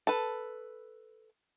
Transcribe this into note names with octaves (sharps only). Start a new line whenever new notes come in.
A4 B4